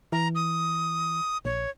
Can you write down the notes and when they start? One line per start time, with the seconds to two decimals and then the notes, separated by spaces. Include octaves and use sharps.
0.12 E3 A#5
0.35 D#6
1.45 A#1 C#5